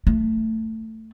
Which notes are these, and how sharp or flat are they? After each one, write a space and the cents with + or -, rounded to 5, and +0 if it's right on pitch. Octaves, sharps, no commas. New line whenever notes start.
A3 +15